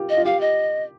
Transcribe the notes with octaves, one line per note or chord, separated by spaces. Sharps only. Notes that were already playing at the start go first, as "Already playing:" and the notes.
Already playing: F4 G4
D#5
F4
G4 F5
D#5